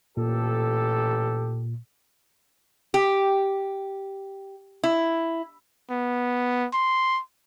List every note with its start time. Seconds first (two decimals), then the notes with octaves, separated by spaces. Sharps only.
0.17 A1 A#2 G4 A4
2.94 G4
4.83 E4
5.91 B3
6.73 C6